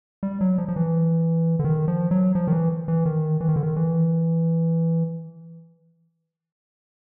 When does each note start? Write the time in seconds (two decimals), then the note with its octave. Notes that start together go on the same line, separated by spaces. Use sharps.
0.23 G3
0.41 F#3
0.58 F3
0.68 F3
0.76 E3
1.59 D3
1.64 D#3
1.88 F3
2.11 F#3
2.35 F3
2.47 D#3
2.52 E3
2.88 E3
3.06 D#3
3.41 E3
3.48 D#3
3.56 D3
3.63 D#3
3.76 E3